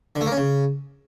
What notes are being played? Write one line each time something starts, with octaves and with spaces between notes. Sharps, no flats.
D3
A3
A#3
C#4
C#3